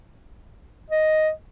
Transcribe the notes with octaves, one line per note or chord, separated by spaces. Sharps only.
D#5